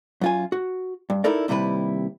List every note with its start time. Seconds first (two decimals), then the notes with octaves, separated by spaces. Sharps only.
0.21 F#2 F4 G#5
0.52 F#4
1.10 G2
1.24 D#4 E4 A4 A#4 D5
1.48 D#2 C3 G3 E4 B4